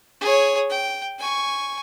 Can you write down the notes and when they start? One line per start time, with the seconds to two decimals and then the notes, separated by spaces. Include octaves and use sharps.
0.21 G#4 C#5
0.70 G5
1.19 G#5 C#6